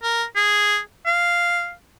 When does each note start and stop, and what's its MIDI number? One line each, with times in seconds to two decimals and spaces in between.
0.03 0.24 70
0.36 0.79 68
1.06 1.73 77